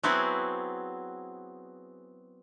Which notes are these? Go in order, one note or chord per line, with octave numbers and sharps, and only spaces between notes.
F#3 B3 C4 E4 F#4 G#4